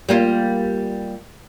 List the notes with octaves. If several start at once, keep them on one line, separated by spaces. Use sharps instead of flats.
G3 A#3 F4